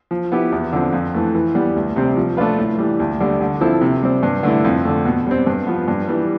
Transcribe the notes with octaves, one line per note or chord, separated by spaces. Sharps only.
F3
B3 E4 G4
E2
D3 F3 C4
F2
E3 A3
E3
G3 B3
D2
C3 G3 C4
F3
A3 D4 F4 B4
A2
E3 G3
D2
D3 G3
D3
F3 C4 E4 A4
C3
G3 C4
G2
D3 A3 E4
F2
D3 A3
B2
G3 C4
G2
F3 B3
G2
E3 G3